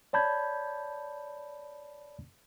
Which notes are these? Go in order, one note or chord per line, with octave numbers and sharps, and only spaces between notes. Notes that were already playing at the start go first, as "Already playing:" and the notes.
C#5 D5 A5 B5 G6 G#6